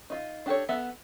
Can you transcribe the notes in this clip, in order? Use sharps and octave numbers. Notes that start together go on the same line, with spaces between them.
D#4 F4
D4 G4 A4 C#5
B3 A4 E5